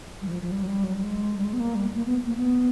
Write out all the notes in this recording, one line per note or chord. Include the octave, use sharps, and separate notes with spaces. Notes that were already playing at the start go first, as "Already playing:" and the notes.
G3
E3
F3
F3
G3
F#3
G3
F#3
G3
G#3
G3
G#3
B3
A#3
G3
A#3
B3
A#3
B3